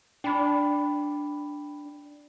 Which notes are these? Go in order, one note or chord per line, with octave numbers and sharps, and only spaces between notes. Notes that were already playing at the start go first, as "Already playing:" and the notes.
D4 G5 B5